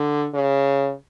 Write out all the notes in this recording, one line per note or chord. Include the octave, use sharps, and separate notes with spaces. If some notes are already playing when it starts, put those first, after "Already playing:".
Already playing: D3
C#3